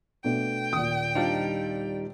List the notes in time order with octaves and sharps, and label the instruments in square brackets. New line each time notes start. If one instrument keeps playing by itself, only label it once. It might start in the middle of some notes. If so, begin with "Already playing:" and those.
[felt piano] B2 A3 D4 [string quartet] G5
[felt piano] D#1 A#2 [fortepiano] D#6
[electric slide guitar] G3 D#4 [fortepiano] C4 D4 F4